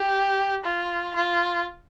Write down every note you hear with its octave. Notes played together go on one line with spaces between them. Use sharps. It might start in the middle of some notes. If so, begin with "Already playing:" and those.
Already playing: G4
F4
F4